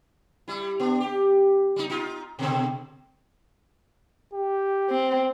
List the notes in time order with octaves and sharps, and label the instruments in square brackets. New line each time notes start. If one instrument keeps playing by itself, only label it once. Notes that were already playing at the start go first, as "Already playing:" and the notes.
[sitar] G3 E4
B3 D4
G4
G3 D#4
D#4 F4
B2 D3 C4
[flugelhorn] G4
[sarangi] C4